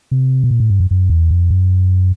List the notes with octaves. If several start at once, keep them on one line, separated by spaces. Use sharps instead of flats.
C3
B2
A#2
A2
G2
F#2
F#2
E2
F2
F#2